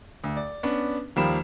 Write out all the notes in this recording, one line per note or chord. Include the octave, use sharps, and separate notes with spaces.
D2
D5
B3 C#4 D4
D#2 F3 G3 A#3 B5 E7